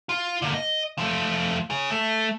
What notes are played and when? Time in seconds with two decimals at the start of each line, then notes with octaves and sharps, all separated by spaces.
0.09 F4
0.42 D3 A#3
0.54 D#5
0.98 F3 A3
1.70 G#4 C#5
1.90 A3